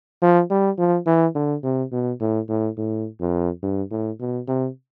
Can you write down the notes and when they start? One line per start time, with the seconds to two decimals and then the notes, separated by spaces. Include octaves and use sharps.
0.22 F3
0.50 G3
0.78 F3
1.07 E3
1.35 D3
1.63 C3
1.92 B2
2.20 A2
2.49 A2
2.77 A2
3.20 F2
3.63 G2
3.91 A2
4.20 B2
4.48 C3